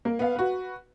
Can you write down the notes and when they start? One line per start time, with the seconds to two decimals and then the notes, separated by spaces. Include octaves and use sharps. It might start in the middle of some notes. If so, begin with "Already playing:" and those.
0.05 A#3
0.19 B3 F5
0.36 F#4 B4